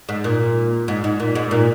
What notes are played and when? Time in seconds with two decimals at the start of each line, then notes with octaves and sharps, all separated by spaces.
0.09 G#2
0.24 A#2
0.88 G#2
1.04 G#2
1.20 A#2
1.35 G#2
1.51 A#2